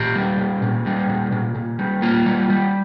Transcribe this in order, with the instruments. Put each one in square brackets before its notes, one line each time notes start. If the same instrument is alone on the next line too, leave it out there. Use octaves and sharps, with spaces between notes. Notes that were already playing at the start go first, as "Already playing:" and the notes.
Already playing: [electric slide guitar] A#2 G4
G3
A#2
A#2
G3
A#2
A#2
A#2
G3
A#3 F4
G3
G3